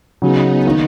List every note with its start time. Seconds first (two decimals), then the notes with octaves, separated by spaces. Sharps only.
0.22 C#3 F#3 B3 C#4 D#4 G#4
0.65 D#3 A#3